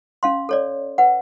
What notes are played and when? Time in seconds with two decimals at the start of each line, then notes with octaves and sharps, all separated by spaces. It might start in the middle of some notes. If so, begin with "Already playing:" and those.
0.23 C#4 F5 C6
0.49 A4 C#5 D5
0.98 B4 F#5